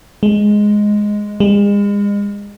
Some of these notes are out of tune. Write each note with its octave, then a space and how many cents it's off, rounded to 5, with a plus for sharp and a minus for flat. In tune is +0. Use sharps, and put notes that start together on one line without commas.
G#3 +0
G#3 -40